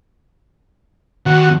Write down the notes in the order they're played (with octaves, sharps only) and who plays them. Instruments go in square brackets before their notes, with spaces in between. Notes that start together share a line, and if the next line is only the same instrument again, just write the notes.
[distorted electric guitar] D#2 [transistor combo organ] F#4